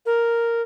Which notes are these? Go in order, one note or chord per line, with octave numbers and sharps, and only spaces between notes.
A#4